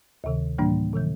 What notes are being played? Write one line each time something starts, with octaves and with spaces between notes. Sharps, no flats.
D2 C3 D#3
A2 E3 G3 A#3 D4
C3 D#3 F#3